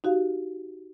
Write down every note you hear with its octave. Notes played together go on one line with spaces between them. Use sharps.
D#4 F#4 G4 F5